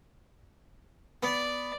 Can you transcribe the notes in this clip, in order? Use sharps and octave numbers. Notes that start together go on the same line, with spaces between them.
B3 D5